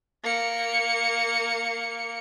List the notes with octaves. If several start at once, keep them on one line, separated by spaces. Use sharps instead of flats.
A#3 C#7